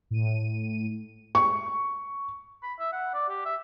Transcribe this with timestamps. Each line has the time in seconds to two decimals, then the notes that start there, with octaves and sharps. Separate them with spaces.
0.10 A2 D#7
1.35 C#6
2.63 B5
2.79 E5
2.93 F#5
3.14 D5
3.29 G4
3.46 E5